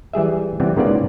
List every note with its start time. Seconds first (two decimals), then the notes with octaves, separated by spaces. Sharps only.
0.13 E3 G3 G#4 E5
0.60 C3 E3 G3 B3 C4
0.77 G#2 C#3 A#3 B3 F4 D5